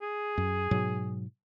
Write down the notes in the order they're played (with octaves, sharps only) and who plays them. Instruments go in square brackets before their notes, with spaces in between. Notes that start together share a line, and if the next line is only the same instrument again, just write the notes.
[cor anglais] G#4
[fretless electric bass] F#2
G#2 B2 F#3